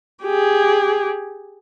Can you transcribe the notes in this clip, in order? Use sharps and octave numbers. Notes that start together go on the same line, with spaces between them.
G4 G#4